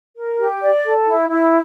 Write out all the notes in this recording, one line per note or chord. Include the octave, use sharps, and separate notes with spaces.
A#4
G4
D5
A4
E4
E4